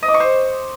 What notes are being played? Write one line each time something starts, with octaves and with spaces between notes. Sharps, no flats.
D#5
D6
C#6
C5